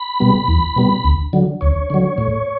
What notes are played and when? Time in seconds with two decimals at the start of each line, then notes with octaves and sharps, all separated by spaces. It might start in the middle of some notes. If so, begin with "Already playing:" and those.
Already playing: B5
0.20 B2 G3 B3
0.48 E2
0.76 B2 G3 B3
1.04 D2
1.33 D3 F#3
1.61 D2 C#5
1.90 D3 F#3
2.18 A2